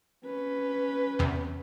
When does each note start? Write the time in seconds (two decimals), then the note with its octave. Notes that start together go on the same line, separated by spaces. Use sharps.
0.25 C#4 B4
1.19 E2 C3